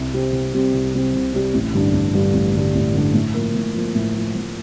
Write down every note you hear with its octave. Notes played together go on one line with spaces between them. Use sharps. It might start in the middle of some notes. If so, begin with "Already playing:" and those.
Already playing: C2
C3 G3 C4 G4
C2
C3 G3 C4 G4
C2
C3 G3 C4 G4
C2
C3 G3 C4 G4
A1
G2 D3 G3 D4
A1
G2 D3 G3 D4
A1
G2 D3 G3 D4
A1
G2 D3 G3 D4
A2
F3 A#3
A2
F3 A#3
A2
F3 A#3
A2